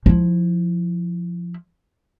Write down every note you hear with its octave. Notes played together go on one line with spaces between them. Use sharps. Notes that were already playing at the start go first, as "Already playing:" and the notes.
F3 E4